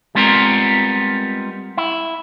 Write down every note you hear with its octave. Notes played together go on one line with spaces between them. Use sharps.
G3 G#3 B3 C4 F4 A#4
E4